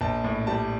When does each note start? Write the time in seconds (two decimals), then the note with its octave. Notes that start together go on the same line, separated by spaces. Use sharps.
0.01 A#1 A5
0.24 A2
0.47 G3 A5